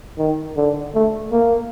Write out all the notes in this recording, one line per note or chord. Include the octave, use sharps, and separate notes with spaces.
D#3
D3
A3
A#3